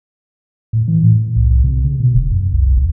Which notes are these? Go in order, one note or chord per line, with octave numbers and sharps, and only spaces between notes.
A2
E3
A2
C2
C2
C3
C#3
B2
E1
F#2
C2
D2